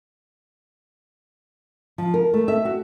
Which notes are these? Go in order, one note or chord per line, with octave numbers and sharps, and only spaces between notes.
F3
A#4
A3
E5
F#4